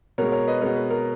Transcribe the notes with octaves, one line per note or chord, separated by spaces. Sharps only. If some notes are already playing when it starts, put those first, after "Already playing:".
B2 G#3 A#4 C#5
A#4 C#5
B4 D#5
B2 G#3 A#4 C#5
B4
A#4